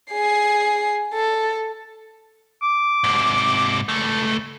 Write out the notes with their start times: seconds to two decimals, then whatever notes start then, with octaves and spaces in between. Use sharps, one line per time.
0.13 G#4 C7
1.14 A4
2.62 D6
3.04 G#2 C3
3.89 C#2 A3